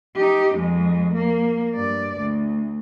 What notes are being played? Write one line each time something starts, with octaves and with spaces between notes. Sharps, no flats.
D#4 G4
F2 G#3
A#3
G2 D5
D2